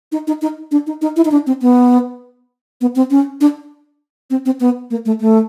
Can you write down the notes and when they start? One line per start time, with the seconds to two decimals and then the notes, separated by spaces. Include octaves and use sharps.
0.12 D#4
0.27 D#4
0.42 D#4
0.71 D4
0.87 D#4
1.02 D#4
1.16 E4
1.25 D#4
1.31 D4
1.47 C4
1.62 B3
2.81 B3
2.96 C4
3.11 C#4
3.41 D4
4.30 C4
4.46 C4
4.60 B3
4.90 A#3
5.06 A3
5.20 A3